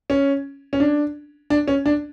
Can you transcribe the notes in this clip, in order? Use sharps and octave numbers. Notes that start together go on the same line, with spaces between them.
C#4
C#4
D4
D4
C#4
D4